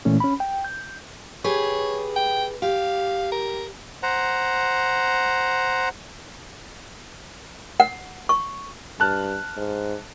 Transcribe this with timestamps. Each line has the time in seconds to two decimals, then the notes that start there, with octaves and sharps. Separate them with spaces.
0.05 A#2 E3 A3 C#4
0.20 C#4 B5
0.40 G5
0.64 G6
1.44 G4 G#4 B4 C#5
2.16 G5
2.62 G4 F5
3.32 A#4
4.03 C5 F#5 A#5
7.80 F#5
8.29 C#6
9.00 G2 A5 F6 F#6
9.57 G#2